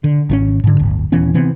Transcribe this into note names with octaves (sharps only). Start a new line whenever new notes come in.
D3
G#1 D#3 C#4
G#2 D3
D1 G1
D#1 E3 B3 C#4
C3 E3 B3 C4